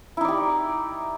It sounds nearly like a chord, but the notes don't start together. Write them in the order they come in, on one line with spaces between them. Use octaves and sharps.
E4 D#4 D5 G4